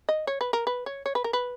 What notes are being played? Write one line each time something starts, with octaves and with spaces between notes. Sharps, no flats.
D#5
C#5
B4
A#4
B4
C#5
C#5
B4
A#4
B4